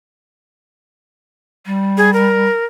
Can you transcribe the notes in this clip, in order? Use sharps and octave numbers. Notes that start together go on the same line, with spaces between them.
G3
G#4
A#4